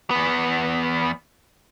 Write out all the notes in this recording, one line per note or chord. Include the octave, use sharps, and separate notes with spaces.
E2 B3